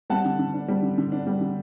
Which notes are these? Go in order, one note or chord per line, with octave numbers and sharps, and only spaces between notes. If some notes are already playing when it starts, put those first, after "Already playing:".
G3 F#5 A5
D3
D3
D4
G3
D3
D3
D4
G3
D3